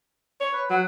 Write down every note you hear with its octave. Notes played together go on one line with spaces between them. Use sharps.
C#5
B4
F#3 F#5